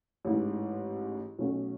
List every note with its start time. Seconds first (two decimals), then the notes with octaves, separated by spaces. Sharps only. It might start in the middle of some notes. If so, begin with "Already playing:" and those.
0.25 A1 G#2 E3
1.38 B1 B2 A3 C#4 F#4